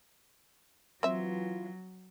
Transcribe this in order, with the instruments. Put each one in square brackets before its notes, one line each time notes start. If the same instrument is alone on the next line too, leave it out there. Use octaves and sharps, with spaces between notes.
[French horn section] E3 F4 [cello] F#3 [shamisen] C4 E5